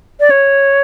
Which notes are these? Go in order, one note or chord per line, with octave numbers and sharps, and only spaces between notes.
D5
C#5